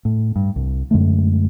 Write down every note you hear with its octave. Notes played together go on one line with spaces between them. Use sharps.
A2
G2
C2
F#2 D3 G#3 A3